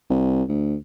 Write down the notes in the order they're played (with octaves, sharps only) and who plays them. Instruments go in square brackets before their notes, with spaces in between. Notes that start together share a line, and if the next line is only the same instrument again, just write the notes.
[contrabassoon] C2
D2